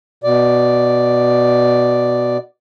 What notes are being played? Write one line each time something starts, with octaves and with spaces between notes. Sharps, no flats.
B2 D5